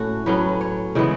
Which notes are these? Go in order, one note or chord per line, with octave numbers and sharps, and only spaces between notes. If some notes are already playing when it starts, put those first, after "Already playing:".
Already playing: A2 A3 C#4 F#4
A2 F#3 C#4 B4
C#5
C#3 E3 G#3 B3